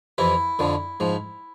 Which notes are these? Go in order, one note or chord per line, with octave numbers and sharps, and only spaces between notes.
F2 C3 E3 E4
F2 D3 F3
G#2 F3